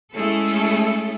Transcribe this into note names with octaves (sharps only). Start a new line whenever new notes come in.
G#3 A3 C#4 E4 G#4 A4